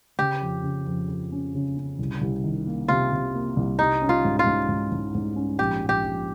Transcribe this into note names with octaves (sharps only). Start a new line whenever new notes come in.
C#3 G4
F2
C#3
F2
F2
C#4
C#3
C#4
C2
C2
D#3
A#3
C3 F4
C3
A#3
C2
G3 D#4
C#4
F4
G#2
F4
G#2
G#2
G#2
G#2
C#4
A#1 G4
A#1
G4
A#1